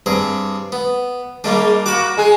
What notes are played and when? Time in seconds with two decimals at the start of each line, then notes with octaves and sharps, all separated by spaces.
0.06 G2 C3 G#4
0.72 B3
1.44 G3 G#3 A#3 D4
1.86 A#3 F#4 B5 D6
2.17 G#3 G#4